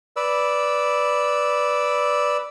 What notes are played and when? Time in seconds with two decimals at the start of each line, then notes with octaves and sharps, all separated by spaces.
0.16 B4 D5 E6